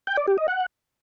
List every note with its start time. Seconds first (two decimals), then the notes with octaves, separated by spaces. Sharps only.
0.07 G5
0.17 D5
0.27 G4
0.38 D#5
0.48 F#5